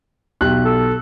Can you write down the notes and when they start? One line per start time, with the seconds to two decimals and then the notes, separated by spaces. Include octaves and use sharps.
0.41 B1 G4 F#6
0.65 A4